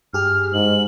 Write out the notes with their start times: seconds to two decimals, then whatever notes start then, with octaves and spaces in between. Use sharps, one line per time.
0.14 G2 G4 G#4 F6
0.53 G#2 F#7